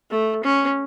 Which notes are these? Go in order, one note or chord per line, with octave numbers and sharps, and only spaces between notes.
A3
C#4